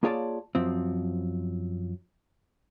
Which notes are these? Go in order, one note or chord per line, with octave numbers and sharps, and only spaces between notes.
A#3 F4 G#4 C#5 D5 A5
F#2 F3 C4